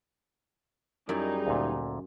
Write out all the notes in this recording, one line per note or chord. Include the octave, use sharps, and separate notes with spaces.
F#2 G3 D#4 E4 G#4 D5
D2 A#2